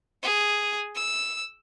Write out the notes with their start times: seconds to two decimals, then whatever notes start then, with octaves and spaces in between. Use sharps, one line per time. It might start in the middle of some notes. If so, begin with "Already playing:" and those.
0.23 G#4
0.96 E6